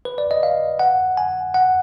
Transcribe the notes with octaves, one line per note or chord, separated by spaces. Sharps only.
B4
D5
D#5
F5
F#5
G#5
F#5